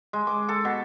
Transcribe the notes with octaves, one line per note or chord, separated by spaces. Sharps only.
G#3
D6
A4
B2